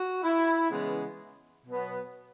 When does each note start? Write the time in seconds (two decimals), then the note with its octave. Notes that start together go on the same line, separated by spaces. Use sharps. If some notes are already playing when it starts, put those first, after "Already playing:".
Already playing: F#4
0.24 E4
0.70 C#3 E3 G#3 B3
1.65 B2 F#3 B3